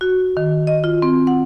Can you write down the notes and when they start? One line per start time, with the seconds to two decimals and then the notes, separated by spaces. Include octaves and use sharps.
0.01 F#4
0.37 D#3
0.67 D#5
0.84 F4
1.02 C4
1.27 F#5